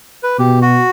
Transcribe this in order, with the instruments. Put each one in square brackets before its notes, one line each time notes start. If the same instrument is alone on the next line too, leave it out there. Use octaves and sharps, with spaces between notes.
[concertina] B4
[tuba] B2 [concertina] G4
[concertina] F#4